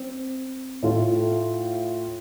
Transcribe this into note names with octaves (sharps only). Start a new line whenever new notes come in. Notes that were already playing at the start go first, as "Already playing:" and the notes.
Already playing: C4
A2 A3 F4 A4